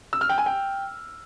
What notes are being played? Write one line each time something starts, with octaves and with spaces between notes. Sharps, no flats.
E6
F6
G5
G#5
G5